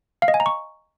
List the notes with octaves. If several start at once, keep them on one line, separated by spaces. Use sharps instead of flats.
F5
D#5
G#5
A#5
C#6